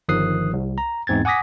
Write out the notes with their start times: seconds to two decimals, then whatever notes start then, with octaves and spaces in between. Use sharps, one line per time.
0.08 G1 D#3 F3 D#6 F#6 C7
0.53 C2
0.78 A#5
1.07 E2 G#2 C4 G#6 A6
1.25 F#5 G#5 D6 D#6 A#6 B6